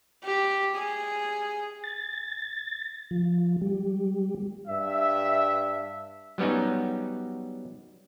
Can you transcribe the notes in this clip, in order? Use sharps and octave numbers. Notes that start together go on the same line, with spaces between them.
G4
G#4
A6
F3
G3
G2 E5
F#3 G3 B3 C#4 D#4